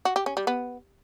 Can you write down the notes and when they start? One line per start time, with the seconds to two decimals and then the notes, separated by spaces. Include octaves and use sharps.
0.05 F#4
0.16 G4
0.26 C#4
0.37 G3
0.47 B3